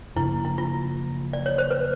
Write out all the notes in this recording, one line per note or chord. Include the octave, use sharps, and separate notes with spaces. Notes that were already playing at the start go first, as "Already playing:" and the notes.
F#2 C#3 F3 A#3 E4
E4
F4
D5
C#5
C5
B4